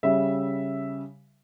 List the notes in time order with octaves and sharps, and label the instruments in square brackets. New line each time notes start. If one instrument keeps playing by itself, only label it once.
[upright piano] C#3 G3 E5